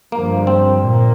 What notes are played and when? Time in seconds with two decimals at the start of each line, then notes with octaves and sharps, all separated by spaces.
0.12 G2 D3 F3 A#3
0.47 C4
0.81 A#2 A#3